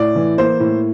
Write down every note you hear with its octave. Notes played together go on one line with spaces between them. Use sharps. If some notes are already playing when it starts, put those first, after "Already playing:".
Already playing: A2 D5
E3
A#3 C5
A2